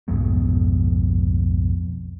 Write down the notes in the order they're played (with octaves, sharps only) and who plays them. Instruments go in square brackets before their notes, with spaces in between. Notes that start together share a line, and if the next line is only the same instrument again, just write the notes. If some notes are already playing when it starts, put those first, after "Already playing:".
[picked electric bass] B1 F2 G#2 B2